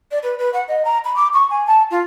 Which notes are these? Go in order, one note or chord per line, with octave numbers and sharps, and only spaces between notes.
D5
B4
B4
F#5
D#5
A#5
B5
D6
C#6
G#5
A5
F4